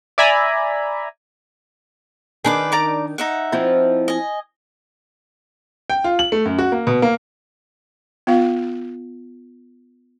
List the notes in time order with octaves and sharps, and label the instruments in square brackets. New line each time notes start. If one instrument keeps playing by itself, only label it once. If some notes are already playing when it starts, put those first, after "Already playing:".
[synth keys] D5 E5 G#5 A#5 B5
[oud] D#3 D4 [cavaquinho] G#4 B4 D6
[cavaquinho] D5 A#5 D6
D#4 E5 F#5
[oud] F3 C4 E4
[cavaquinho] D#5 G#5
[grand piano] G5
F4
F#7
A3
F#2
F#4
A#3
B2
A#3
[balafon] B3 F4 F5